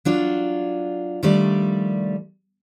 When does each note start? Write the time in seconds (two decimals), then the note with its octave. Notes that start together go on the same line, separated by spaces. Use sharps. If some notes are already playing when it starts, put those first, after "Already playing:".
0.05 F#3 D4 F4
1.23 D#3 F3 G3 A3 D4 D5